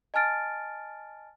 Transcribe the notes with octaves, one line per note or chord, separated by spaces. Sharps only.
D#5 G#5 A5 F6 A6 D7